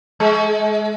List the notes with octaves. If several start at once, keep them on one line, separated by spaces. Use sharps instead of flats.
G#3